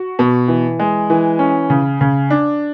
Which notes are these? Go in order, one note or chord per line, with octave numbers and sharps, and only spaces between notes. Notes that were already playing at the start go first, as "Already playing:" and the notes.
Already playing: F#4
B2
E3
G#3
E3
C#4
C#3
C#3
D4